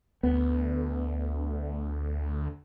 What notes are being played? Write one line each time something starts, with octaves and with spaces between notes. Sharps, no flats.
D2 B3